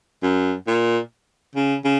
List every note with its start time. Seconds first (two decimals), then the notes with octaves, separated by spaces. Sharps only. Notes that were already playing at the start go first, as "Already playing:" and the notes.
0.22 F#2
0.67 A#2
1.55 C#3
1.84 C#3